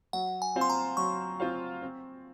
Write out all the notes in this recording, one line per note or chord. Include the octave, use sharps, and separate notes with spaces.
F#3 F#5
G#5
C4 F4 C5 F5
C6
A#5
F#3 C#6
C4 F4 C5 F5
C4